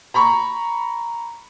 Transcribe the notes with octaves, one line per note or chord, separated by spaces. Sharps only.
A#5 B5 C#6